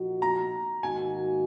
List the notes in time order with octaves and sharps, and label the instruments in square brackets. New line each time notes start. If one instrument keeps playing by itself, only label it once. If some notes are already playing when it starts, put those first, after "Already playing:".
Already playing: [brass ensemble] A#2 F3 A#3 D#4 F#4
[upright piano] A#5
[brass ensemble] G#2 D#3 A#3 D#4 F#4 [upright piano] G#5